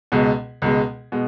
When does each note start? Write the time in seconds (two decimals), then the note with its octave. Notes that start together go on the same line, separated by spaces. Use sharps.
0.12 C#2 B2 G#3
0.62 C#2 B2 G#3
1.12 B2 G#3